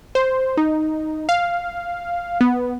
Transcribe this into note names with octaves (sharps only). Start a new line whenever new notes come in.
C5
D#4
F5
B3